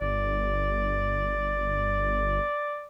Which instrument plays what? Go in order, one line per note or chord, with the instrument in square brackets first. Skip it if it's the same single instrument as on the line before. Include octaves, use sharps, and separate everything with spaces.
[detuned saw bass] G1 [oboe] D5